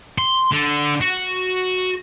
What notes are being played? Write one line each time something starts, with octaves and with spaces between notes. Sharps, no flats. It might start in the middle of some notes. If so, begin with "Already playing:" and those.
C6
D3
F#4